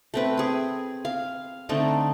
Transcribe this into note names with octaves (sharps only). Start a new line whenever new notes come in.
A3 C4 B4
C4 G#4
F5
D3 A3 C4 D#4